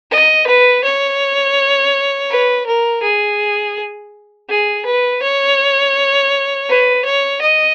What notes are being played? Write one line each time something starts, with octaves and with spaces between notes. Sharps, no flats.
D#5
B4
C#5
B4
A#4
G#4
G#4
B4
C#5
B4
C#5
D#5